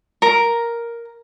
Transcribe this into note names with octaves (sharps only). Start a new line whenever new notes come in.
A#4